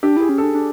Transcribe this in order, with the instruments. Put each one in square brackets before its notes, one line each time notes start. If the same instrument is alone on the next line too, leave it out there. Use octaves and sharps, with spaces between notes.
[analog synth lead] D4 [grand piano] G4
[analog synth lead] E4 [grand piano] G#4
[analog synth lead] C#4
[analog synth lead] D4 [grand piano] A4
[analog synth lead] D4